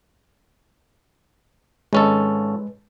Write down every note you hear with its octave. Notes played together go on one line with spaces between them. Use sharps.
G#1 G#3 C#4 A4 B4